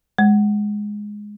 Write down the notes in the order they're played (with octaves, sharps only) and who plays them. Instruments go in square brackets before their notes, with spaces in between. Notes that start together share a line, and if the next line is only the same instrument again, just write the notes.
[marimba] G#3